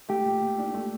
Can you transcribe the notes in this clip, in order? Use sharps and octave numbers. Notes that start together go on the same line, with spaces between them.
A3 G4
A#2
A#2
D4
A3